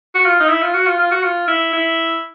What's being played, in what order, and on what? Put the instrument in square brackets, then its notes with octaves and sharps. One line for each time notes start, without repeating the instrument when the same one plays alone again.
[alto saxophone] F#4
F4
D#4
E4
F4
F#4
F4
F4
F#4
F4
E4
E4